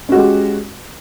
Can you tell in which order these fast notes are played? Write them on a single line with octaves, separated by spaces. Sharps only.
C#4 F#4 G#3 G4